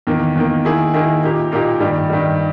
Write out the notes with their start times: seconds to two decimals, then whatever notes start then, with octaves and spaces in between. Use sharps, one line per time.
0.07 E2 D#3 A#3
0.35 E2 D#3 A#3
0.65 D#3 A#3 E4 G#4
0.94 D#3 A#3 E4 G#4
1.23 A#2 A#3 D#4 G4
1.52 A#2 A#3 D#4 G4
1.80 G2 D#3 G3
2.09 G2 D#3 G3